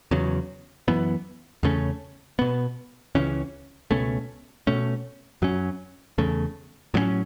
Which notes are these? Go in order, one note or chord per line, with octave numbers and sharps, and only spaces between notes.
E2 C#3 F#3
F#2 E3 B3
E2 C#3 A3 C#4
B2 B3
C#2 C#3 E3 C#4
C#2 B2 A3 C#4
B2 A3 C#4
F#2 F#3 C#4
E2 C#3 A3
A2 F#3 A3 C#4